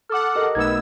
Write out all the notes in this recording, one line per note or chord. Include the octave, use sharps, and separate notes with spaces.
A4 F#5 D6 F6
G4 A#4 D#5
B1 A3 B3 D#4 E6 G#6